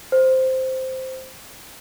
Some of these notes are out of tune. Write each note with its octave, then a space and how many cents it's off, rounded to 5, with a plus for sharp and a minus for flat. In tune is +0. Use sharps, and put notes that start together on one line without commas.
C5 -5